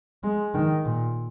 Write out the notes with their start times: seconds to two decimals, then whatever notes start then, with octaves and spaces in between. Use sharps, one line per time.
0.23 G#3
0.54 D#3
0.85 A#2